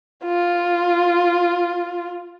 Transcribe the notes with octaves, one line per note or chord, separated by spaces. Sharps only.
F4